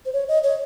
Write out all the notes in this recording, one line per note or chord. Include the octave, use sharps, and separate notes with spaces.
C5
C#5
D#5
C#5